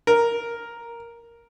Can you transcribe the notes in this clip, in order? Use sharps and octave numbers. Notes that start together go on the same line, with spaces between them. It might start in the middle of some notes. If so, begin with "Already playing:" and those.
A#4